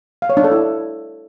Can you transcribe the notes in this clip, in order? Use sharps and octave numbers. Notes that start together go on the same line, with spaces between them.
F5
C#5
D4
A4
E4